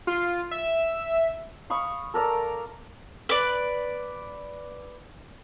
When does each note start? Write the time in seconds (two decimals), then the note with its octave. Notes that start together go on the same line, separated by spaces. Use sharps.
0.07 F4
0.51 E5
1.70 F5 B5 C#6 D#6
2.14 A4 A#4 D5 A#5
3.29 B4 D5